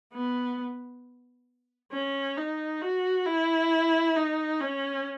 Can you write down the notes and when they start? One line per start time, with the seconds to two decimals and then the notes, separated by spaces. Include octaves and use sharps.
0.13 B3
1.93 C#4
2.37 D#4
2.82 F#4
3.26 E4
4.16 D#4
4.61 C#4